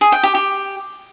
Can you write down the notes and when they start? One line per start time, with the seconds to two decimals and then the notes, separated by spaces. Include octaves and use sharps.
0.01 G#4
0.12 G5
0.23 G4
0.35 G4